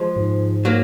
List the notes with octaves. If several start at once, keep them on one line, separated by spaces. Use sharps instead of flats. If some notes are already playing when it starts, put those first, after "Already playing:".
Already playing: F3 G#3
G#2
F#3 A#3